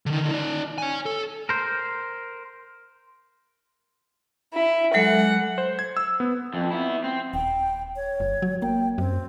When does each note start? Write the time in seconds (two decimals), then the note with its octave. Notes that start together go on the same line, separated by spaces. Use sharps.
0.06 D3 D#3
0.31 D#4 D5
0.78 C#5 G#5
1.06 A4
1.49 A#4 C5
4.53 E4
4.94 F#3 G#3 A4 F#5
5.58 C5
5.79 G#6
5.97 E6
6.20 B3
6.54 F2
6.71 B3 E4
7.04 C4
7.34 D#1 G5
7.96 C#5
8.20 G1
8.42 F#3
8.62 A#3 G5
8.98 F#2 C4